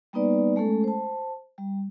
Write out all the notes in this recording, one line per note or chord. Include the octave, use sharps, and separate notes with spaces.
G3 A#3 B3 D#4 B4 D5
G#3 A3 C#4 A4
C5 A5
G3